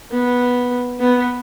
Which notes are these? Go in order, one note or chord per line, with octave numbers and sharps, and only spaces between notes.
B3
B3